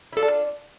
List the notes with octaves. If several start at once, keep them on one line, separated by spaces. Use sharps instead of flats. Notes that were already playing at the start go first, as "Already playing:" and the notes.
E4
D4 F4 A4